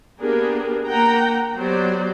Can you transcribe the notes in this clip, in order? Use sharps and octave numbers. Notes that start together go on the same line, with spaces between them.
A#3 B3 D4 G4 G#4 A#4
A#3 F#5 G5 A#5
F#3 B3 G4 C5 D5